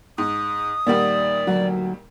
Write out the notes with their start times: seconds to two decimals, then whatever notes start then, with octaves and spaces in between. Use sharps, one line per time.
0.18 G#2 D#6
0.86 A#2 D#3 G3 D5 E5 F#5
1.47 D2 F#3 F#4